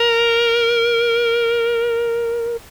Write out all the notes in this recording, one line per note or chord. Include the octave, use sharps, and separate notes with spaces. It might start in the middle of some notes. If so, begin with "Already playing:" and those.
Already playing: A#4